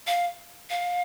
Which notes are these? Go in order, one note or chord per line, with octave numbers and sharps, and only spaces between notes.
F5
F5